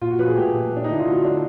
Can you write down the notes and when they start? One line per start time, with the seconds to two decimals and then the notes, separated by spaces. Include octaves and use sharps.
0.01 A#2 F4
0.11 F#4
0.19 F3 B4
0.28 G#4
0.37 A3 G4
0.54 A#2
0.72 A3 D4
0.84 D#4
0.89 D3 E4
0.99 F4
1.06 D3 F#4
1.24 A3 D4